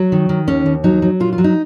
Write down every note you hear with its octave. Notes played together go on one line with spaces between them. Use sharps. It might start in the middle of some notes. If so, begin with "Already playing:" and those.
Already playing: F#3
D#3
D#3
D#2 C#4
D#2
F#3 D#4
F#3
A#2 F4
F4
F#3
D#4